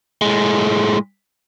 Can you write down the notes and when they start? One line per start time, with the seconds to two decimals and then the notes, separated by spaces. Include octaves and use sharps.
0.22 A2 G#3